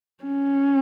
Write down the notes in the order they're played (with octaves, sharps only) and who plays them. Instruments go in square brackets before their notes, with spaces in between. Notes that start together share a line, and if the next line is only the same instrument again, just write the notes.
[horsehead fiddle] C#4